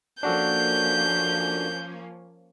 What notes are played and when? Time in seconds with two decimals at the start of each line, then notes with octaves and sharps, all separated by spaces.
0.23 F3 A#3 C#4 D4 F#4 A4 G6